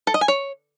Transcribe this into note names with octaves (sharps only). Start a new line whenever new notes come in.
A4
D#5
G#5
C#5